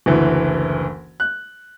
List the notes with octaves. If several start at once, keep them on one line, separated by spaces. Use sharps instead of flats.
F#1 D2 E3
F#6